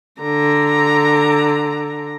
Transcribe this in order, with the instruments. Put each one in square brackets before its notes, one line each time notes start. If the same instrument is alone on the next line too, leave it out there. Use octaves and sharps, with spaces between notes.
[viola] D3 A#5